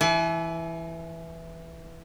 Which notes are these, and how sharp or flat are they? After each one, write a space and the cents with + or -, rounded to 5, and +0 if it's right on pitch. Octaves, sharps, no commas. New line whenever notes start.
E3 +0 G#5 +45